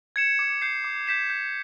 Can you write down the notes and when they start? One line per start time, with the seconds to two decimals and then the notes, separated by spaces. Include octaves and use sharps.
0.16 G#6 C#7 E7
0.39 D6
0.62 G6 C7
0.84 D6
1.07 G6 B6 E7
1.30 G6